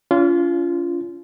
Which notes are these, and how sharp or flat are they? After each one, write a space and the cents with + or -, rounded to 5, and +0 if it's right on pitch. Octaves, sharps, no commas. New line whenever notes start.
C#4 +40 F4 -20